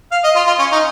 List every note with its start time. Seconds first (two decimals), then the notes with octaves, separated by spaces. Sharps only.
0.11 F5
0.24 D#5
0.36 F4
0.47 F4
0.59 C#4
0.72 D#4